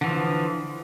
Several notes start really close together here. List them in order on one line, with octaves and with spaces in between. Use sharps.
D3 E3 F3